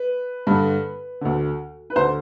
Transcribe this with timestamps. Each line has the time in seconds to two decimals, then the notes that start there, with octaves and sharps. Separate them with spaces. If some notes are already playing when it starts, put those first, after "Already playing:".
Already playing: B4
0.47 G2 D3
1.21 D2 D3
1.90 B4
1.96 D2 D3 C5